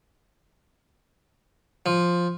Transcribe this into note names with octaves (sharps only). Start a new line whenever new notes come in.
F3